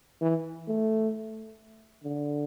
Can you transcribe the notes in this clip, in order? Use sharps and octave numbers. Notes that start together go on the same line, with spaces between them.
E3
A3
D3